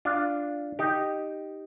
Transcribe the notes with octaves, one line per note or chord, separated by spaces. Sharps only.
D4 F4
D#4 G4